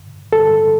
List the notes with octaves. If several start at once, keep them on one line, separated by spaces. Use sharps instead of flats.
A4